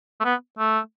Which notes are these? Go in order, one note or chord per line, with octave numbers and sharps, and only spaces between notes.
A3
B3
A3